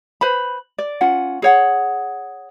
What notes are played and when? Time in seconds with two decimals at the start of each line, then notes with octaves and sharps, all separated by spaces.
0.21 B4 C5 B5
0.78 D5
1.01 C#4 F4 F#5
1.42 G#4 C#5 F#5